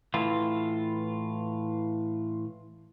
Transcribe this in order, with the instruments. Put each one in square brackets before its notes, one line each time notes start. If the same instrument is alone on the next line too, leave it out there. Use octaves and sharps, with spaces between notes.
[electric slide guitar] A2 E3 F4